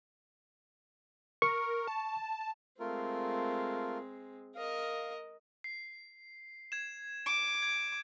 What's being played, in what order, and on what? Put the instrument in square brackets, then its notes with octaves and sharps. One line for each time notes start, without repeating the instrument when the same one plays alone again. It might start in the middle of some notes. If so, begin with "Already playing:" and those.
[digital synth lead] A#4 [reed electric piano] C#6
[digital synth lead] A5
[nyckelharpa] G#3 C4 [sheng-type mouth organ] A3 F4 A#4
[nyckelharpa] A#4 D#5 [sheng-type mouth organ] F5
[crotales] C7
G#6 E7
[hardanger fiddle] D6 [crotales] D7
[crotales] G#6